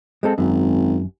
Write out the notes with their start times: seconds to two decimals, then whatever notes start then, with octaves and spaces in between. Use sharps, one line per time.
0.23 G#3 C4 A4
0.38 G#1 F#2